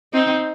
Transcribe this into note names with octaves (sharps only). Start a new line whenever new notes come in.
C4 D#4